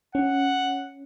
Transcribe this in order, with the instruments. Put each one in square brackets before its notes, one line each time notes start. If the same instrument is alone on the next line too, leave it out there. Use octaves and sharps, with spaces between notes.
[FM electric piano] C#4 [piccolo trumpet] F#5